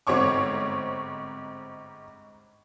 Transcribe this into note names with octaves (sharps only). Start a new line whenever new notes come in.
G1 G#2 C4 C#5 C#6 D6